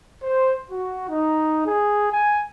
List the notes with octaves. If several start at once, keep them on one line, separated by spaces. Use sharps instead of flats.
C5
F#4
D#4
G#4
G#5